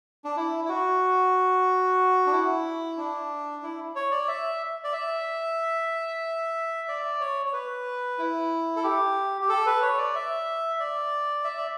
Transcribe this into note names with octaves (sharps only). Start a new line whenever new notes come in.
D4
E4
E4
F#4
D4
E4
D4
E4
C#5
D5
E5
D5
E5
D5
C#5
C#5
B4
E4
A4
G4
G4
A4
B4
C#5
D5
E5
D5
E5
D5